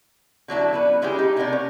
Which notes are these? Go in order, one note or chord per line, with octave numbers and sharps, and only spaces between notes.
D3 F#3 D4 E4
B3 C#4 B4
G#3 C#4 E4 G4 G#4
D#4
C3 A#3 B3 D4 A#4 D5
C#4